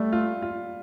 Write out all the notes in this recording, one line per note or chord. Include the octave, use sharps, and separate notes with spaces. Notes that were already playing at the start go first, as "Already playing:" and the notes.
Already playing: G3 A3
F4
F4